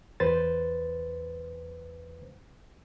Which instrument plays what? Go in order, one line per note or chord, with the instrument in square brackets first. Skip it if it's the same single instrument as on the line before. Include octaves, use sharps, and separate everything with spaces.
[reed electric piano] E2 B4 C5 A6